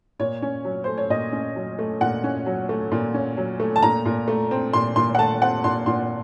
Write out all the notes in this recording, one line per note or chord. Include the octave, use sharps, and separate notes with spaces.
A#2 C#5
C#4
F#3
A3 C5
C#5
A#2 D#5
C#4
F#3
A3
A#2 F#5
C#4
F#3
A3
A#2
C#4
F#3
A3
A5
A#2 A#5
A#2
A3
C4
A#2 C6
A#2 C6
F#5
A3 A5
C4 F#5
A#2 C6
A#2 C6